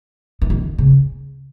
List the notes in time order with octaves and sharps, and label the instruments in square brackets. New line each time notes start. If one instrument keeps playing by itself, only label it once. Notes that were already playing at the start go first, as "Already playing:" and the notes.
[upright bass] E3
D#3
C#3